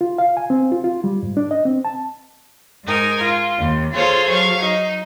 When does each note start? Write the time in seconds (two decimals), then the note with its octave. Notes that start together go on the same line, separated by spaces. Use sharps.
0.01 F4
0.18 F5
0.37 G#5
0.50 C4
0.72 F4
0.84 F4
1.04 G3
1.23 G#2
1.37 D4
1.51 D#5
1.65 C4
1.85 A5
2.84 G#2 D#4 A#4 G#5
3.22 F4
3.57 D#2
3.94 F4 G#4 A4 C5 C#5 F5
4.30 F#3 F5 C#6
4.60 D#4